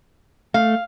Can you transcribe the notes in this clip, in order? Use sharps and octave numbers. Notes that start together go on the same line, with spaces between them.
A3 F5